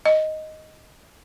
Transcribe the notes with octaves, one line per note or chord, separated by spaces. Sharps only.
D#5